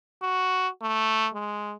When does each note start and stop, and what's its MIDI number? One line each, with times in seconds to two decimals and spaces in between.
0.22 0.68 66
0.82 1.28 57
1.34 1.74 56